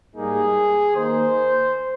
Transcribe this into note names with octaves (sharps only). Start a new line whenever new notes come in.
G#2 G3 A#3 D#4 G#4
D#3 A#3 D#4 C5